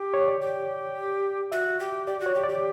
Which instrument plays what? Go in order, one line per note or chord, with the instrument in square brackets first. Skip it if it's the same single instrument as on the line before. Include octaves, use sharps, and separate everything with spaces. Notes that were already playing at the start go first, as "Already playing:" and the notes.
Already playing: [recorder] G4
[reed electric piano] C#5
D5
[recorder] G4
[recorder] F#4 [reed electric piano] E5
[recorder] G4
[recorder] G4 [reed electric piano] D5
[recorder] F#4
[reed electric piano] C#5
[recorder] G4
[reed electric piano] D5
[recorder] G4